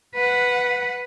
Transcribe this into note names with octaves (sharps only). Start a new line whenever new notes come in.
B4 F#5